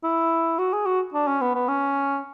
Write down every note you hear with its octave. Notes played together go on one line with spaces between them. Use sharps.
E4
F#4
G#4
F#4
D4
C#4
B3
B3
C#4